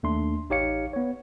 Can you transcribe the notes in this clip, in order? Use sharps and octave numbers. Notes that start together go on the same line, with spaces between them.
D#2 A3 D4 C6
A1 D#4 G4 C#5 F5 C#7
B3 C#5